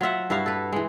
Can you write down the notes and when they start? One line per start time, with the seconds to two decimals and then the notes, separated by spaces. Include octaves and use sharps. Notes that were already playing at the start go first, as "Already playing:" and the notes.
0.01 F#3 F4 E5 F#5
0.30 G2 E4 F#4 F5
0.46 A4 B4
0.73 E3 G#3